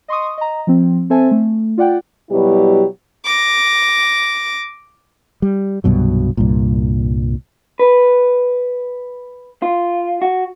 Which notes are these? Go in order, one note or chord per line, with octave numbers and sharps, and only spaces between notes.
D#5 C6 C#6 D#6
D#5 A#5
F3 C4
C4 A4 C5 E5 G#5 A5
A3
F4 D5 F#5 G5
B2 F#3 G3 E4 G4
D6 A#6
G3
C2 G2 B2 F#3
C2 G2 A#2
B4
F4
F#4